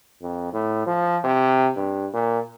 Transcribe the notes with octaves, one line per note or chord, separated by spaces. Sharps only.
F2
A2
F3
C3
G2
A#2